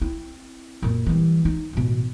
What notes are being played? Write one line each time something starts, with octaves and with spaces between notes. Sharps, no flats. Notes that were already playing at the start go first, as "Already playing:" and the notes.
C4 E4
F#2 A#2
E3 G3
D#4
A1 B2